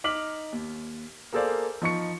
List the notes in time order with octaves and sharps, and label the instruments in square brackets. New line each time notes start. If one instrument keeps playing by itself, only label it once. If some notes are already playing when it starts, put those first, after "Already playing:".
[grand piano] D#4 D6 F6 B6 F#7
D#2
A#3 G#4 A4 C5 D5 F5
F3 D#4 C#6 C#7